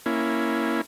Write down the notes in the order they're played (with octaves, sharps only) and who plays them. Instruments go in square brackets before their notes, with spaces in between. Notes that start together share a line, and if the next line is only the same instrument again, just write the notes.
[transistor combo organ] A#3 C#4 E4